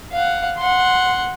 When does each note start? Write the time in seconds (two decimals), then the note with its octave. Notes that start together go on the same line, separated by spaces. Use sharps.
0.13 F5 F#5
0.58 F#5 C6